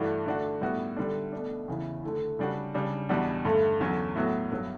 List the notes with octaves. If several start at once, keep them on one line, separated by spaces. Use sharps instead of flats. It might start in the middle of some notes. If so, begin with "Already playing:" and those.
Already playing: G2 E3 A3 D4 F#4
D3 A3 D4 F#4
A2 G3 B3 F#4
D3 G3 D4
B2 A3 D4
E2 C#3 E3
D3 A3 E4
C#3 G3 D4 F#4
C#3 G3 D4
E2 B2 G3 D4 F#4
G2 D3 A3
E2 D3 F#3 C#4
A2 F#3 B3 F#4
G2 F#3 B3